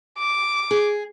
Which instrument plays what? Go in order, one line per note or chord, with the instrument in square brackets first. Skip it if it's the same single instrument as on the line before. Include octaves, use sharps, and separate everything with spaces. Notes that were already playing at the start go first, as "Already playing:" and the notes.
[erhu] D6
[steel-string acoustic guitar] G#4